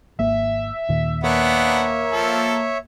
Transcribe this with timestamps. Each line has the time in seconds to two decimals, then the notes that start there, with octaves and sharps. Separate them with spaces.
0.19 G#1 A#3 E5
0.89 D#2 A#2 D#3
1.24 A#3 B3 D4 C#5 E5 F#5
2.12 F3 A4